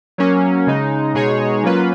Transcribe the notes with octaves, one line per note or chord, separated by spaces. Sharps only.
F#3 A#3 C#4
C#3 G#3 D#4
B2 G#3 D#4 G#4 C#5
F#3 A#3 C#4 F4 B4